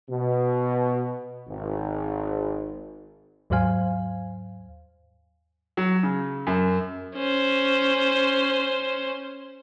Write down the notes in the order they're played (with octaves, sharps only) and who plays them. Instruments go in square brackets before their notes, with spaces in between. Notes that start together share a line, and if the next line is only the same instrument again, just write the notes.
[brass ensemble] B2
G#1
[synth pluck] D#2 G#2 F#3 C5 F5 G#5
[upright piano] F#3
C#3
F#2
[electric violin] C#4 C5